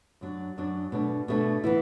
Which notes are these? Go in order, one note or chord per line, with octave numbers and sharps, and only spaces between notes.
F#2 F#3 D4
F#2 F#3 D4
B2 A3 D4
B2 A3 D4
E3 B3 E4